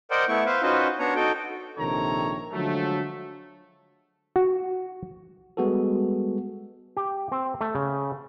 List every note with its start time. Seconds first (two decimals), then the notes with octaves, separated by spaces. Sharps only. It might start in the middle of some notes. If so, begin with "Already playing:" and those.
0.11 A#4 C5 D5 D#5 F#5 G5
0.28 A3 B3 E4 C#6
0.46 B4 C5 E5 F5
0.62 C#4 D#4 F4 F#4 B4 C5
0.99 B3 D4 C#5 A#5
1.16 D#4 F#4 A4 G5
1.77 A#1 C3 D#3 A4 C#5 A#5
2.53 D3 F3 F#3 G#3 A3
4.36 F#4
5.57 G3 G#3 B3 F#4 G#4 A4
6.97 G4
7.32 C4
7.61 A3
7.75 C#3